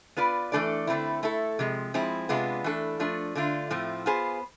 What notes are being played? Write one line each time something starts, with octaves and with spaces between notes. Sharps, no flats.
B3 F4 B4 D5
E3 A3 D4 A4 D5
D3 A3 C4 E4
A3 E4 A4
C3 F3 G#3
F3 G#3 C4 E4
C3 G#3 B3 D4 F4
E3 A3 D4 A4
F3 A3 D4
D3 A3 D4 F4
A2 F3 A3 C4
B3 F4 G#4 C5